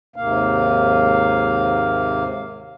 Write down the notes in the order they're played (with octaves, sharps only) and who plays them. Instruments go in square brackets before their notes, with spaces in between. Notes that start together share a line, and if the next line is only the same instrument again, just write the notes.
[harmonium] D#2 G#2 C3 A#3 F5